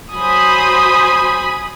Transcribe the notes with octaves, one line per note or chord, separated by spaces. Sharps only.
F#3 C5 G#5 B5 D#6